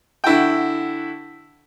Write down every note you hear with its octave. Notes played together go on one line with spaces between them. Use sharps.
D3 E4 F#4 G5